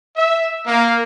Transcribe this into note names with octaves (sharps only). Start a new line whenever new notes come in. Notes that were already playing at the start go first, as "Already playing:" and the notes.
E5
A#3